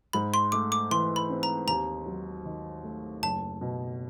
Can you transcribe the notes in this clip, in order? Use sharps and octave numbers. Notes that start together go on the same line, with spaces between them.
G#2 B5
C6
A3 D6
D6
E3 C6
B5
C4
A#5
D#2 A#5
F#3
D#3
A3
F#1 A5
B2